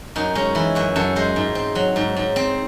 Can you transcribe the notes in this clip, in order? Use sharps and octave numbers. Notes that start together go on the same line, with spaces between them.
F#2 D#4
G#3 C#4
E3 E4
F#2 F#4
F#2 A4
G#3 C5
G#2
C4
F#3
G#2
G#2
C4